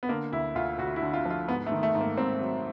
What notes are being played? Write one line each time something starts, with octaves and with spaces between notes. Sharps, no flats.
B3
D3 A#3
D2 E4
D2 F4
D2 F#4
E4
D3
F4
F3
F4
G#2 B3
A3
D#3
A3
G#2
A#3
G#2 C4
F#3